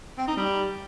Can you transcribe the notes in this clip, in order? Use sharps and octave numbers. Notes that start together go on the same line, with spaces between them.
C4
D#4
G3